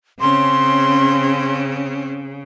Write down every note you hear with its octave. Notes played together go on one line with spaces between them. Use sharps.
C#3 C4 C#4 C6